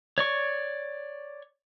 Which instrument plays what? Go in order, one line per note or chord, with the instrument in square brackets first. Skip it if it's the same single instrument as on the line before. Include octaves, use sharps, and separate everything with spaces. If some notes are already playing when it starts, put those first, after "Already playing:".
[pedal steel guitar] C#5 D5 C#6